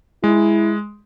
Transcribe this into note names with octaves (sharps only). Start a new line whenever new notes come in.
G#3 E4